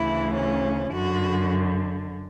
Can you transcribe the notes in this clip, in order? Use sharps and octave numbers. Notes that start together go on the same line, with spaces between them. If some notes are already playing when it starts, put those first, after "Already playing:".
Already playing: D2 C#3 E3 E4
C#4
F#2 D3 F#4